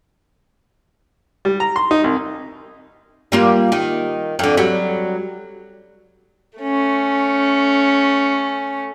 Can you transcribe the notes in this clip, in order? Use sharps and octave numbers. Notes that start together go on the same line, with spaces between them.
G3
A#5
C6
D#4
C2
G3 A#3 F4
D#3
F2 D3
F#3 G3
A3 C#4